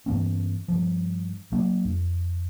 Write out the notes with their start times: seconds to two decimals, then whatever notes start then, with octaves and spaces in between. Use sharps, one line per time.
0.06 G2 E3 B3 C#4
0.68 G2 F3
1.52 F#3 A#3 D4
1.85 F2